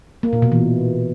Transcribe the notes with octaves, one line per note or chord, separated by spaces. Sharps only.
A#3
A#2
B2
E3